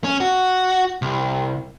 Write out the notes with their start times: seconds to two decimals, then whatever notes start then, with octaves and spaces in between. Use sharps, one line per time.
0.04 C#4
0.20 F#4
1.02 C2